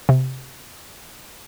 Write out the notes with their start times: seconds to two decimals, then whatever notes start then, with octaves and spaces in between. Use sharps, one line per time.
0.09 C3